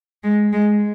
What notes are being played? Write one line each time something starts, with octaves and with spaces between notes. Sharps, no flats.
G#3
G#3